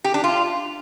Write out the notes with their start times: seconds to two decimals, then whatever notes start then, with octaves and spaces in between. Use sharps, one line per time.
0.04 G4
0.14 D4
0.24 F4